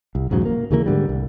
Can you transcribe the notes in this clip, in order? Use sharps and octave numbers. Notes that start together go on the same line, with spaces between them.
C2
E1 G#2 C#3 F#3
A#3
D#2 C#3 E3 A#3
G#2 D3 G3
C2